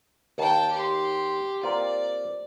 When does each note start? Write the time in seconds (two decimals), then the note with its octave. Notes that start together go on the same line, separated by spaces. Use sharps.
0.38 D#2 D#3 G5 A5
0.72 G4 C6
1.63 A#3 C4 F4 D5